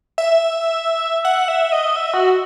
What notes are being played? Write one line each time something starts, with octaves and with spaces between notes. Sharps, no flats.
E5
F#5
E5
D#5
E5
F#4